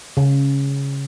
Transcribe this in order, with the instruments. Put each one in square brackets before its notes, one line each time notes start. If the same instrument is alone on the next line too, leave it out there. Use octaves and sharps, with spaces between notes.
[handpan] C#3